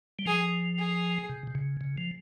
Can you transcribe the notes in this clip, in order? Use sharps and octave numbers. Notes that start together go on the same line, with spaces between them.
G3
F3 G#4
G#4
C3
C3
C#3
C#3
F3